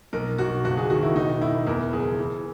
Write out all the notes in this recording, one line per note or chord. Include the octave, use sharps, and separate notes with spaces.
B1 A#4
B1 F#4
F#1 F#4
G#4
D#3 F#4
E4
E1 D#4
E1 E4
E2 A#4
F#1 G#4
E3